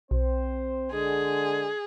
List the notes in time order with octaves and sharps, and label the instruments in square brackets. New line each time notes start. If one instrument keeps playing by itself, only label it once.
[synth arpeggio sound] B1 [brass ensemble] C4 C5
[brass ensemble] D3 G#3 [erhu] G#4